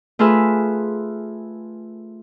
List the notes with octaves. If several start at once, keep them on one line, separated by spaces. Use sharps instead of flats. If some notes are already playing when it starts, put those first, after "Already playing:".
A3 F4 G#4 B4 E5